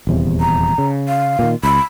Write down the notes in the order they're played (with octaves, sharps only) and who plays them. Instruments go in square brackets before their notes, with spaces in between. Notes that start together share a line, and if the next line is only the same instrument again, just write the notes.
[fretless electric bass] D#1 E2 C3
[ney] A#5
[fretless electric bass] C#3
[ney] F5
[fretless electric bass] A#2 D3 D#3
[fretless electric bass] C#2 [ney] B5